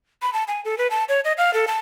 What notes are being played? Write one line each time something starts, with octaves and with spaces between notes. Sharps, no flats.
B5
A5
G#5
A4
B4
A5
C#5
D#5
F5
A4
A5